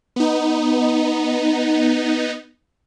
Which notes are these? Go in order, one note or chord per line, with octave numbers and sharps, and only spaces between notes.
B3 D#4